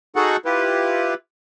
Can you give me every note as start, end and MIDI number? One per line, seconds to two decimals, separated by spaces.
0.16 0.37 63
0.16 0.37 66
0.16 0.37 68
0.16 0.37 69
0.16 0.37 78
0.16 0.37 85
0.45 1.14 64
0.45 1.14 65
0.45 1.14 67
0.45 1.14 71